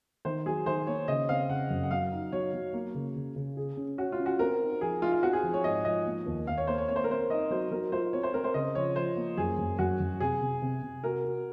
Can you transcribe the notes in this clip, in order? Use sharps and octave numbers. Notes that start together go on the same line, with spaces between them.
D#3 C5
F#3 G#4
D#3 C5
A#3 C#5
C#3 D#5
C4 F5
C#3 F#5
F#2
F#5
F#3 F5
D#4
F#3 C#5
F#3
A#3
C#3
C#3
C#3
G#4
C#4
F#4 C#5
F4
C#4
F#4
C4 A#4
D#4
F3 G#4
D#4 F4
F4
C4 F#4
G#4
F3
C#5
G#2 D#5
F3 D#5
A#3
D#2
D#2 F5
C#5
A#3 C5
C#5
C4 C#5
C5
A#4
C4 C5
D#4 D#5
F#3 C5
F#3 A#4
F4 C5
C4 C#5
C5
C4 A#4
C5
C#3 D#5
F3 C#5
F3 C5
A#3
F#2 G#4
F#2
F#2 F#4
F#2
C3 G#4
C3
C3
C3
F#4 A#4
F#4